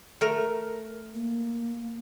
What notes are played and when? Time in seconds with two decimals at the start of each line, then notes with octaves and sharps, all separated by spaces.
0.21 A3 A#4
1.14 A#3